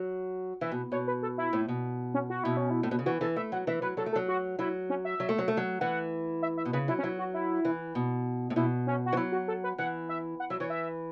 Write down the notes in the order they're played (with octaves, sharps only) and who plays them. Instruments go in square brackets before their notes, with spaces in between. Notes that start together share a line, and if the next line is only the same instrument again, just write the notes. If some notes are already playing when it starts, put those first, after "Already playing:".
Already playing: [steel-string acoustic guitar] F#3
[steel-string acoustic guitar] E3 [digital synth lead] E5
[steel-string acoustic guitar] B2
[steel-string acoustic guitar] B2 [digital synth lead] C#5
[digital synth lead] B4
A4
E4
[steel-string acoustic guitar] A2
B2
[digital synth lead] C#4
F#4
[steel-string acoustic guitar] B2 [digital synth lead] E4
[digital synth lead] C#4
E4
[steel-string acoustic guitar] A2
B2
C#3
[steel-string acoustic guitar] E3 [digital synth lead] F#4
[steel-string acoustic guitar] E3 [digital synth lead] A4
[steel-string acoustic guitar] A3 [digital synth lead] E5
[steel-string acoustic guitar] F#3 [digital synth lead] F#5
[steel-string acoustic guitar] E3 [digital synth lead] E5
[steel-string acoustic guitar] F#3 [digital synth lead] B4
[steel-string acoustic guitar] F#3 [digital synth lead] A4
[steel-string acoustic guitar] A3
[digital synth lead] A4
[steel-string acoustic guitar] F#3
[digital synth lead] F#4
[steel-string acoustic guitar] F#3 [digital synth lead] E4
[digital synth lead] C#4
E5
[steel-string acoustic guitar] F#3
A3
F#3
A3
F#3
[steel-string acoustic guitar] E3 [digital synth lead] F#5
[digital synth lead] E5
E5
[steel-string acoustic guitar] B2
[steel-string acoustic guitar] C#3 [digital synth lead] B4
[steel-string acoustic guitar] F#3 [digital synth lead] E4
[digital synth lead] C#4
[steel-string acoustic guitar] F#3 [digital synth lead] E4
[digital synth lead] F#4
E4
[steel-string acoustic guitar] E3
B2
A2
[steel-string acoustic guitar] B2 [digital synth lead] E4
[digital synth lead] C#4
F#4
[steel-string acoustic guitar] E3
[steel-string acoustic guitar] F#3 [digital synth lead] E4
[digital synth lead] F#4
A4
B4
[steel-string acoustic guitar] E3 [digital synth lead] F#5
[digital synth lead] E5
F#5
[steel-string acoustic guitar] F#3 [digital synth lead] E5
[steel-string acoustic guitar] E3 [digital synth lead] C#5
[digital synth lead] E5